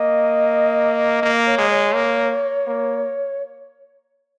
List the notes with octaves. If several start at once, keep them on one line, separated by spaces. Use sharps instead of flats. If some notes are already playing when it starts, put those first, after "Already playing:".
Already playing: A#3 D#5
A#3
C#5
G#3
C#5
A#3
A#3